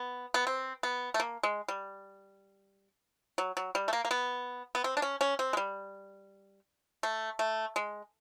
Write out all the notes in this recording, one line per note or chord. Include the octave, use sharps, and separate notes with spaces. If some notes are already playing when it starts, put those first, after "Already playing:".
Already playing: B3
B3
C4
B3
A3
A#3
G#3
G3
F#3
F#3
G3
A3
A#3
A#3
B3
B3
C4
D4
C#4
C#4
C4
G#3
G3
A3
A3
G#3